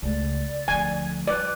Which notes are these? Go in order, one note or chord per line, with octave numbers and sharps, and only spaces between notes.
C#2 A3 D5
D2 F3 G#5
G3 F4 B4 D5